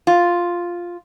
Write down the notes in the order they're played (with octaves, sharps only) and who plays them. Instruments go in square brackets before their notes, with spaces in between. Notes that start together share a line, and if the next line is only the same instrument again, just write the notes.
[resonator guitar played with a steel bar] F4